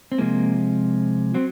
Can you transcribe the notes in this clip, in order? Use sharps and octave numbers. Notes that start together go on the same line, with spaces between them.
C4
C3 F3 G#3 A#3
F#3 C4